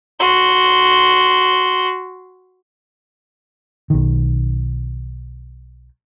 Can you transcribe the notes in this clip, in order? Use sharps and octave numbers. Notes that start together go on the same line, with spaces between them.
F#4 C6
B1 D#3